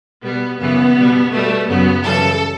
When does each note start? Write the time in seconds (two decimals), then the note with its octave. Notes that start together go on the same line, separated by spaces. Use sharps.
0.23 B2 G3 B3
0.59 F#2 C#3 E3 B3
0.95 B2 G3
1.31 B2 G3 A3
1.67 F#2 C#3 F#3 B3
2.03 F#2 C#3 E3 G3 A4